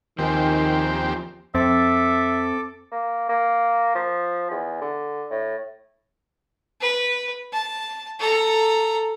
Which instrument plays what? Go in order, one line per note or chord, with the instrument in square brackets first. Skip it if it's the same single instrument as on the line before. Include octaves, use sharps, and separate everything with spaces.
[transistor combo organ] D#2 C4 G4 [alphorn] D#3 [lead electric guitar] F3 G#4
[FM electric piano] F2 A6 [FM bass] C4 [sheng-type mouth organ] A4 D6 [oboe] E5
[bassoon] A#3
A#3
F3
E2
D3
A2
[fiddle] B4
A5
A4 A#5